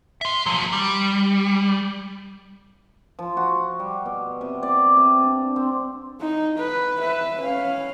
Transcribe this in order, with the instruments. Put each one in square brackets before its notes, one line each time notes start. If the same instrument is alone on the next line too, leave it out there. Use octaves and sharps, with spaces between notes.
[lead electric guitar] E5 C6
F3 F#3
G3
[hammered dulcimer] F3
F#4
G3
B2
C3
D5
C3
D4
C4
[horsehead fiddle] D#4
B4
B4 E5
C#4 F5